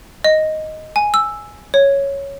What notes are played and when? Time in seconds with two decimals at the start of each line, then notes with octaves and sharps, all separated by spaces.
0.24 D#5
0.96 G#5
1.14 E6
1.74 C#5